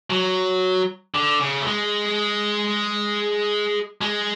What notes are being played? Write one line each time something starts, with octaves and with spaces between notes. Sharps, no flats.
F#3
D3
C#3
A3
G#3
G#3